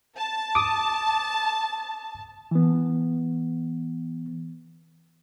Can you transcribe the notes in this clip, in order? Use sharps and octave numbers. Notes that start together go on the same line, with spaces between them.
A5
D6 D#6
E3 B3